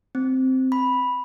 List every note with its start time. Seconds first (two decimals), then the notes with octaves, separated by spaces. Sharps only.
0.15 C4
0.72 B5